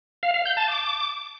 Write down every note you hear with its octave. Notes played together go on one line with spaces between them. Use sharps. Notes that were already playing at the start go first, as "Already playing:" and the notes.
F5
F5
G6
A5
D6